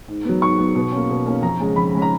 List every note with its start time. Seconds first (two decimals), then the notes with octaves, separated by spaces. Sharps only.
0.08 G#2
0.25 F#3 B3
0.42 G#2 C#6
0.58 F#3 B3
0.75 B2
0.92 A#3 C#4
1.09 B2
1.26 A#3 C#4
1.42 F2 A#5
1.60 C#3 G#3 C#4
1.76 F2 B5
1.93 C#3 G#3 C#4
2.02 A#5